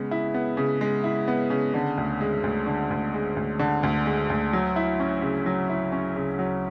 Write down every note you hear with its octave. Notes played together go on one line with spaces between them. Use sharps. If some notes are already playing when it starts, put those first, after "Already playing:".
Already playing: C#3 G#3 B3
E4
B3
C#3
G#3
E4
B3
C#3
D3
D2
G#3
D2
D3
D2
G#3
D2
D3
D2
G#3
D2
F#3
E4
C#4
C#3
F#3
E4
C#4
C#3
F#3